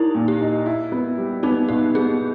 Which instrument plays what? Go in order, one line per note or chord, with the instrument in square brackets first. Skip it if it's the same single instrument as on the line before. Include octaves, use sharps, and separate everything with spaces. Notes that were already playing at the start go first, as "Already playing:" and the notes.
Already playing: [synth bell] D#4 E4 G4 [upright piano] A#4
[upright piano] A#2
[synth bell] G4
[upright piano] D#4
E4
B3
G3
[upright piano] B3 [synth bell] D#4
[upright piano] B2 [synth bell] G4
[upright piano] B3 [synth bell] G#4